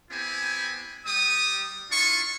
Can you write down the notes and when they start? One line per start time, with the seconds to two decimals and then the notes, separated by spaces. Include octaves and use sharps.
0.10 B3 C4 E4 G4 G#5
1.06 G3 G4 D#6
1.90 D4 E4 F4 C6 C#6